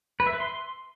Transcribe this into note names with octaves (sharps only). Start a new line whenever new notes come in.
B4
E5
B4
C6